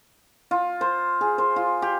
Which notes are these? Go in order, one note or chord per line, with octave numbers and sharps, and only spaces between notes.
F4
C5
G#4
C5
F4
G4